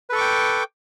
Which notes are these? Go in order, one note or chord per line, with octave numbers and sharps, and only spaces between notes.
A4 B4 G5 C#6 D6